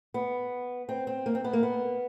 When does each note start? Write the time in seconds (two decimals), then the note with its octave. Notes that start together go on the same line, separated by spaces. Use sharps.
0.14 B3
0.89 C4
1.07 C4
1.26 A#3
1.35 C4
1.44 B3
1.53 A#3
1.63 B3